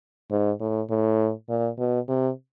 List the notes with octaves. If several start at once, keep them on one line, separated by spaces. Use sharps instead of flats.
G#2
A2
A2
A#2
B2
C3